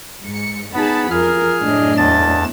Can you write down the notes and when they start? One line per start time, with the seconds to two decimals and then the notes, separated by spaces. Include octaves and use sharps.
0.25 G#2 C#7
0.74 B3 D#4 G#4 A5 B5
1.11 F2 F4 G#4 A#4 F6
1.63 F#2 A2 D4 D#5
1.98 E2 A5 A6